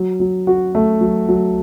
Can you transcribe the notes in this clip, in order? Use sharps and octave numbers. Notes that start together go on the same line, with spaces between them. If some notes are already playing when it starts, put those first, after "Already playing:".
Already playing: F#3
F#3
F#4
A3
F#3
F#3